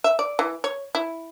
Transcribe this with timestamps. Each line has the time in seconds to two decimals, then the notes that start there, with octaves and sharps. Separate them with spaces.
0.04 E5
0.19 D5
0.39 E3
0.64 C#5
0.95 E4